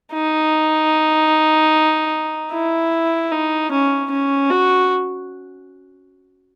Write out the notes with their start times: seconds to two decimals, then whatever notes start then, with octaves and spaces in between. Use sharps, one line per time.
0.13 D#4
2.52 E4
3.32 D#4
3.71 C#4
4.11 C#4
4.50 F#4